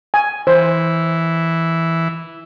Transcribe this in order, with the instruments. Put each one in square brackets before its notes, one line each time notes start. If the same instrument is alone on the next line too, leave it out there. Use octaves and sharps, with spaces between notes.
[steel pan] G#5
[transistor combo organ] E3 [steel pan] C5